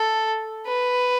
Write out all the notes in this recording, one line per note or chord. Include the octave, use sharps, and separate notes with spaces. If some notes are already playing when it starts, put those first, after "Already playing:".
Already playing: A4
B4